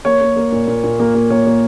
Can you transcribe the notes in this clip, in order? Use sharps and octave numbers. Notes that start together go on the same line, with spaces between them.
A#3 C#5
A#3
A#3
A#2
A#2
A#2
A#3
A#3
A#3 C#5
A#3